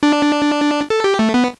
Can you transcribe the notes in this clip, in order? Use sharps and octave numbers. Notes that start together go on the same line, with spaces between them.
D4
A4
G4
A3
B3